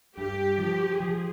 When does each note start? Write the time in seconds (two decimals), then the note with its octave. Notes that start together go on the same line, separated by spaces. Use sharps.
0.18 G2 G4
0.59 F3
1.00 F3 G#4